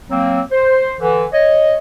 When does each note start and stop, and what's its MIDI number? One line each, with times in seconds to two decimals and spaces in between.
0.11 0.41 54
0.11 0.41 58
0.11 0.41 60
0.51 0.93 72
1.00 1.25 50
1.00 1.25 52
1.32 1.76 73
1.32 1.76 75